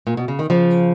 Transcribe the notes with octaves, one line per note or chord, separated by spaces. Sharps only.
A#2
B2
C#3
D#3
C#3 F3